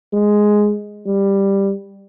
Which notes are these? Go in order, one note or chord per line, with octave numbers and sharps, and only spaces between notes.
G#3
G3